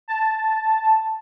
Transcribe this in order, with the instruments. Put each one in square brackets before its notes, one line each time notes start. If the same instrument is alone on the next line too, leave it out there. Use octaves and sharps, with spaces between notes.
[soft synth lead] A5